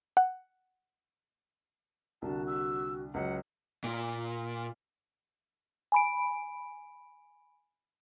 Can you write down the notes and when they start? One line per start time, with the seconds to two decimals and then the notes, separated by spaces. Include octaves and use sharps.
0.17 F#5
2.22 C2 D3 F#4 A5
2.47 E6
3.14 C#2 F#3 F#5
3.84 A#2
5.92 G#5 B5 D7